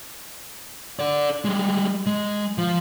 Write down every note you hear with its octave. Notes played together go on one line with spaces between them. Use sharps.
A4 D5
G3 G#3
G#3
F3